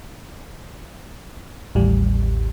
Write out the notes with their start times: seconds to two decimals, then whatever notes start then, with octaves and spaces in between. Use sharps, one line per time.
1.75 A1 D#2 A2 G3